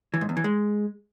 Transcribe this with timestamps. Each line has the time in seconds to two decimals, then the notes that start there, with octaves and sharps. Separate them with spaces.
0.14 E3
0.21 G#2
0.29 E2
0.37 E3
0.44 G#3